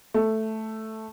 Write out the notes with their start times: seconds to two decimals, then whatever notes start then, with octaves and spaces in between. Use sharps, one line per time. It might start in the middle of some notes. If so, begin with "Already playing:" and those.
0.14 A3